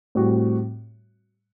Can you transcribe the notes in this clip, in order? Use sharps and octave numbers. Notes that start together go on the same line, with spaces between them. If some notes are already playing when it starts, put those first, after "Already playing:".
A2 G3 C4 F#4